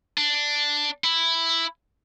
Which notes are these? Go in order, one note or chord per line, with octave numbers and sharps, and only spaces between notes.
D4
E4